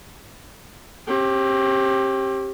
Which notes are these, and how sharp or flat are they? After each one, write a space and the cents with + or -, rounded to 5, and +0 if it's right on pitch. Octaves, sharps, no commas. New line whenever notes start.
C4 +45 G4 +0